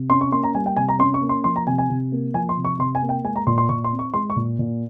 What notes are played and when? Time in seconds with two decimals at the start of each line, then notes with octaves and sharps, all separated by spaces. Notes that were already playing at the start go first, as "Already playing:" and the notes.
Already playing: C3
0.10 C#4 C6
0.21 C#6
0.32 A#3 C6
0.44 A#5
0.55 G3 G#5
0.66 G5
0.76 C3 G#5
0.89 A#5
0.99 C#4 C6
1.14 C#6
1.21 A#3
1.29 C6
1.44 F3 C6
1.56 A#5
1.67 C3 G#5
1.78 G#5
1.90 C3
2.12 A#3
2.34 F3 G#5
2.49 C6
2.57 C3
2.65 C#6
2.79 C3 C6
2.95 G#5
3.02 A#3
3.09 G5
3.24 G#3 G#5
3.36 A#5
3.47 A#2 C6
3.58 C6
3.69 A#2 C#6
3.84 C6
3.92 C4
3.99 C#6
4.14 G#3 C6
4.30 C#6
4.36 A#2
4.59 A#2